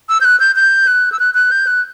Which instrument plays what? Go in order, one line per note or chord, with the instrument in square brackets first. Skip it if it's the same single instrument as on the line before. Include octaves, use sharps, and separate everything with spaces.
[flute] E6
G6
F#6
G6
G6
F#6
E6
F#6
F#6
G6
F#6